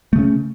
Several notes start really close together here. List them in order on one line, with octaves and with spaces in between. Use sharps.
A3 C#3 C#4